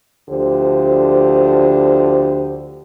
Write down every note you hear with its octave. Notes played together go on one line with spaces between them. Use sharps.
D2 D3 F3 G4 C5